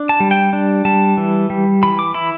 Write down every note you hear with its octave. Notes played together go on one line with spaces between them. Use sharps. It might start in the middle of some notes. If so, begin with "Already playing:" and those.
Already playing: D4
A5
G3
G5
D4
G3 A5
E3
G3
E3 B5
D6
E4 B5